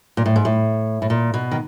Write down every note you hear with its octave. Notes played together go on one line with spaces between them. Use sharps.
A#2
A2
G#2
A2
A2
A#2
B2
D#3